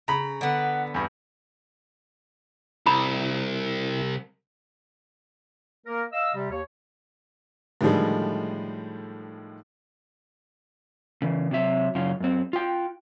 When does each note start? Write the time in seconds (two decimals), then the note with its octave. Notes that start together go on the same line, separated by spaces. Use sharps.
0.08 C#3 A#5 B5
0.41 D3 B3 F#5
0.94 E2 G2
2.86 C2 C3 E4 A#5 B5
5.86 A#3 A#4
6.13 D#5 F5 E6
6.34 C3 G3
6.51 D#2 C#5
7.81 A2 D3 D#3 F3 G3 G#3
11.22 C#3 E3
11.51 C3 F#3 E5
11.95 F#2 C#3 C#4 F4
12.20 F#2 C4
12.53 F4 G5